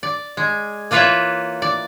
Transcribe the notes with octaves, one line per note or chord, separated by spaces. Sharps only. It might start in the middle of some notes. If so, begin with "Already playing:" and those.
D5
G#3
E3 A#3 F4 B4 C#5 E5
D5